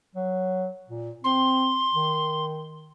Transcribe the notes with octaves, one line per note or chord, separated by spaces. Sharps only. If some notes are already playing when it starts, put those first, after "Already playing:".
F#3
A#2
C4 C6
D#3